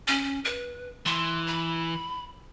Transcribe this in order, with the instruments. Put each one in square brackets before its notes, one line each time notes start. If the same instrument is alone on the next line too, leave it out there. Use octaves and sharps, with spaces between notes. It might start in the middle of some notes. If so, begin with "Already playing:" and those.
[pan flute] C#4
B4
[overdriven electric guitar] E3 [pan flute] C6
[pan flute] B5